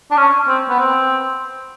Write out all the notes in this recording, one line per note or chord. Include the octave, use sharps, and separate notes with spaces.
D4
C#4
C4
B3
C4